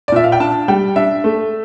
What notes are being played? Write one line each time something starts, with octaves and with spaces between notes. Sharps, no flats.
D5
A#2 E5
F5
G5
D4 A5
G3 G5
D4 E5
A3